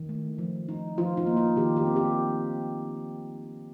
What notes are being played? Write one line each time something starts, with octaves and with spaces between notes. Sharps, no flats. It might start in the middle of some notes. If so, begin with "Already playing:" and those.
Already playing: D#3
A3
F3
D#4
F3 F4
D#4
A#3
F4
D#3 G4
G4
C4
G4